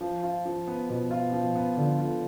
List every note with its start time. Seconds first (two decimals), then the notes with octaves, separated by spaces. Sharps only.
0.01 F3
0.23 F4
0.46 F3
0.67 B3
0.90 B2 F3
1.11 F4
1.32 F3
1.55 B3
1.77 D3 F3
1.99 F4